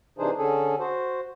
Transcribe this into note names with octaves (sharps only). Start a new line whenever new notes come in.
C3 E3 D4 D#4 G#4 C5
D3 C#4 G#4 A4
F#4 C5